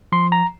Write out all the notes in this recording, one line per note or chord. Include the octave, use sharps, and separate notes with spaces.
F3 C6
A#5